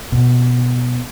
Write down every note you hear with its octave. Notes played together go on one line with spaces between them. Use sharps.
B2